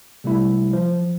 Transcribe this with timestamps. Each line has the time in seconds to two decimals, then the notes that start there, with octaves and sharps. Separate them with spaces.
0.24 C3 G3 A3 E4
0.73 F3